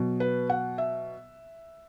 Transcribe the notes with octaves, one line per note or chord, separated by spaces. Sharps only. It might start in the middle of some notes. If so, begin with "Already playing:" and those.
Already playing: B2 F#3
B4
F#5
E5